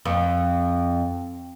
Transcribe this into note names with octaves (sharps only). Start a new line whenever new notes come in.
F2